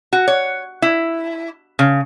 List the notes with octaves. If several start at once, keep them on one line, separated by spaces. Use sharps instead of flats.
F#4
C#5
E4
C#3